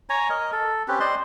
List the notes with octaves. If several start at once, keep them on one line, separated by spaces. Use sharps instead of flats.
C#5 G#5 A#5
A#4 D#5
A4
C4 C#4 G4 B4
C5 D5 D#5 C6